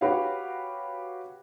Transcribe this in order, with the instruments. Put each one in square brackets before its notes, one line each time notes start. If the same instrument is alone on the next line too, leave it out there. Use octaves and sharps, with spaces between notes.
[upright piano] F#4 G4 B4 C#5 F5 F#5